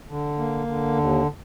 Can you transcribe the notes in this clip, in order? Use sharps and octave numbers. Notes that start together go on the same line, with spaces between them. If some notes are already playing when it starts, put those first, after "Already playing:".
D3
A#3
D3
D#2